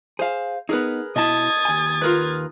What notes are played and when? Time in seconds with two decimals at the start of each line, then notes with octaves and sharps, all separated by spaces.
0.19 G#4 C5 F5
0.69 B3 D#4 G#4 A#4 B4
1.16 B2 E4 D#5 A5 D#6 G#6 A6
1.65 D#2 G#5
2.01 F4 A#4 B4